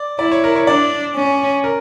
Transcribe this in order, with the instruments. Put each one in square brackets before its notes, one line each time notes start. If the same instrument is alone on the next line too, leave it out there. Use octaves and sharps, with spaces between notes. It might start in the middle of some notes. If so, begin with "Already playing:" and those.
Already playing: [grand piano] D5
[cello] E4 [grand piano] D5
[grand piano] C#5
A#4
C#5
[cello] D4 [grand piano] D5
[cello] C#4
[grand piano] A#4